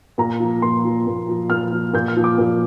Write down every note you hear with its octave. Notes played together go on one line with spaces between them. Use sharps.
A#2 A#5
F3
A#2 C6
F3
A#2
F3
A#2 F6
F3
A#2 G6
F6
F3
D6
A#2